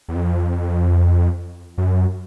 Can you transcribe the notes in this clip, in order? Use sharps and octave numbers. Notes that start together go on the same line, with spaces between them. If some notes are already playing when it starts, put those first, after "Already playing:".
E2
F2
F#2